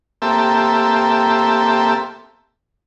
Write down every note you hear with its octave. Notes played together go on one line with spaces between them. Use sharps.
A#3 C4 G4 A4 E5